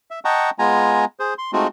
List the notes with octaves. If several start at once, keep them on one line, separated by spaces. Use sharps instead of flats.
E5
D#5 F#5 G5 A5 A#5 C#6
G#3 B3 F4 G#5 A#5
G#4 C5
C6
G#3 A3 C4 D#4 F4 F#4